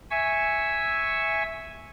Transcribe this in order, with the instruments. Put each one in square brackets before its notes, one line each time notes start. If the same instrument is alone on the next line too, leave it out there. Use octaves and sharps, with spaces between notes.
[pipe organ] E5 G#5 C#6 E6